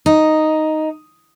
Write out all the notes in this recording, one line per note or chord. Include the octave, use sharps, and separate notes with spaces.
D#4